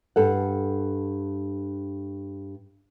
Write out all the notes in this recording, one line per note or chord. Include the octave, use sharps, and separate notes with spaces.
G2 A4 F#5